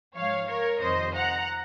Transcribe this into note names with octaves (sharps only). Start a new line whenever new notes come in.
G#2 F3 C#5 F5
A#4 C#5
F2 C3 D#3 C5 D#5
F#5 A#5